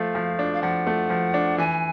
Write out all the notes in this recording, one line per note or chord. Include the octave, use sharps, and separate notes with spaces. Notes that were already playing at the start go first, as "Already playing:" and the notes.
Already playing: F3 A3 F5
F3
D4
F5
F3 F#5
A3
F3
D4
E3 G#5